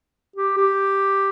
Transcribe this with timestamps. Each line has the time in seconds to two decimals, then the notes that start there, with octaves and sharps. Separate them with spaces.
0.36 G4
0.57 G4